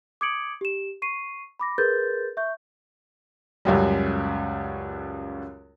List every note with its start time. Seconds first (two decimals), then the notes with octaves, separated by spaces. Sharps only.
0.21 D6 D#6 G#6 C#7 D7 F#7
0.61 G4 E7
1.02 C#6 C7 D#7
1.59 B5 D6 A#6
1.78 G#4 A#4 B4 C6 G6 A6
2.37 E5 C#6 G6
3.65 C#2 F#2 G3